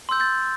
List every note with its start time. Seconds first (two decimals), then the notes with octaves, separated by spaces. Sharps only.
0.09 C6 E6 G6
0.20 G6 A6